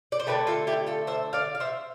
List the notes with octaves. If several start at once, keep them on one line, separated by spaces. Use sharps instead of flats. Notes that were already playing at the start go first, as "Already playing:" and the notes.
D5
C5
D3 A3 G4 B4
F4 A4
E4 G4
F4 A4
C5 E5
D5 F5
F5
C5 E5